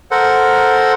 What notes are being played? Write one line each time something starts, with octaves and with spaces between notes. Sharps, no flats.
A4 A#4 C5 F#5